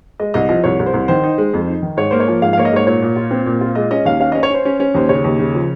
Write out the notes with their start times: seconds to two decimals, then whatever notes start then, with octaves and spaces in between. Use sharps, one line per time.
0.20 G#3 D#5
0.34 C2 D#5
0.49 F3 D#5
0.64 C2 C#5
0.79 C2
0.86 C5
0.94 C2
1.08 D#3 C5
1.24 D#4
1.38 G#3
1.54 F2
1.67 D#4
1.82 D#3
1.97 G#2 C#5
2.11 A#3 C5
2.20 C#5
2.28 F3
2.42 G#2 F5
2.53 F5
2.58 A#3 C#5
2.65 D#5
2.72 G#2 C#5
2.87 A#2 C#5
3.02 A#2
3.16 F4
3.31 C4
3.46 A#2
3.61 F4
3.75 G#3 D#5
3.91 C#4 D#5
4.05 D#2 F5
4.20 C#4 F5
4.32 C#4 D#5
4.43 C#5
4.50 C#4 C5
4.65 C#4
4.80 C#4
4.95 D#2 C5
5.09 C#3 C#5
5.24 D#2
5.39 C#3
5.55 F3